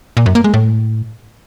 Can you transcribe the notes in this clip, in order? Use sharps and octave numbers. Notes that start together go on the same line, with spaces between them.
A#2
F#2
A#3
G#3
A2